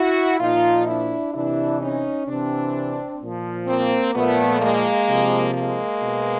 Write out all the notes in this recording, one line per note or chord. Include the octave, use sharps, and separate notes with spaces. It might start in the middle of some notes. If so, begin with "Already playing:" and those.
Already playing: E4 F#4
A#2 F3 D#4 F4
D4 E4
C3 E3 D4 E4
C#4 D#4
C3 E3 C4 D4
A#2 F3
A#3 C4
A#2 F3 A3 B3
G#3 A#3
C3 F3
G#3 A#3
B2